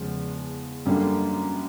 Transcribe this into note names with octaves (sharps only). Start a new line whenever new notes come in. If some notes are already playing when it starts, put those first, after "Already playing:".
Already playing: E2 C#3 F3 G#3
F#2 D3 G3 A#3